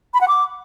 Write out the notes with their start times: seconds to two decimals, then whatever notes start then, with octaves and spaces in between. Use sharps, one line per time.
0.14 B5
0.21 F#5
0.28 D6